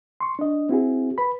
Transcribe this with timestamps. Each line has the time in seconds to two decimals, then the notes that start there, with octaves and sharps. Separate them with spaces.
0.21 C6 C#6
0.39 D4 D#5
0.69 C4 E4 F#4 G#4
1.18 B4 B5